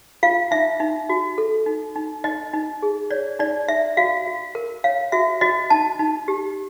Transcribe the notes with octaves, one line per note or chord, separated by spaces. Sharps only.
F4 F5
D#4 E5
D#4
F#4
A4
D#4
D#4
D#4 D#5
D#4
G#4
C#5 D5
D#4 D5
D#4 E5
F#4 F5
F#4
A#4
C#5 F5
F#4 E5
F#4 D#5
D#4 A5
D#4
G4